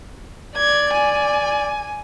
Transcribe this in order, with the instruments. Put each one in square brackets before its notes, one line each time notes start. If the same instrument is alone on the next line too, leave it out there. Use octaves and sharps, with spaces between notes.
[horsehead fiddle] D5 [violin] G#6
[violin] G#5